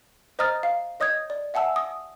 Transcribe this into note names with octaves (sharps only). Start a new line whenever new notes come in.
C5 D#5 A#5 D#6 F6 A6
F5
C#5 D#5 D#6 G6 G#6
D5
E5 F#5 G#5 A5 E6
D#6